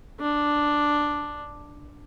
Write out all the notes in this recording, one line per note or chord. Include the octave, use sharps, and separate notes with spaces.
D4